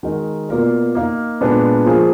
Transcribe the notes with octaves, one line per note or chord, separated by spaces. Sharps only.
D#3 G#3 D#4 F#4 A#4
B2 A#3 F4 A#4 D5
A#3 D#4 A#4 F5
A#2 G#3 B3 D4 F4
F3 A#3 F4 G#4